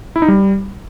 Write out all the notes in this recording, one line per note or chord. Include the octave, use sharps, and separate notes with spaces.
E4
D#4
G3